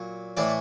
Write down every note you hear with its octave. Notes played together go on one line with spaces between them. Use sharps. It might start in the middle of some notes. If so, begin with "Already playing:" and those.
Already playing: A#2 F#3
A2 E3 D5